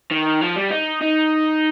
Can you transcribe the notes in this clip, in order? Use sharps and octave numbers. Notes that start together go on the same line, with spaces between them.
D#3
F3
G3
D#4
D#4